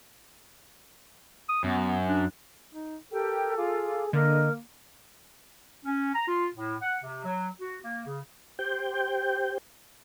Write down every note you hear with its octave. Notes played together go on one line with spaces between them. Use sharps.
D#6
F#2 B3
D4
D#4
G4 A4 A#4 G5
F4 G#4 D6
D3 A#3 A#4 D#5
C#4
A#5
F4
A2
F#5
C3
F#3
F#4
A#3
C#3
G4 C5 G5 G6